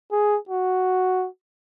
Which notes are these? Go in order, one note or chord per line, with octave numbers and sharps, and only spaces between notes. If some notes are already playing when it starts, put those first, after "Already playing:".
G#4
F#4